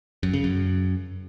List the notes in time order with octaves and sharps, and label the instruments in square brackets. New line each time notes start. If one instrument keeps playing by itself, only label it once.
[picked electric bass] F#2
C#3
F#2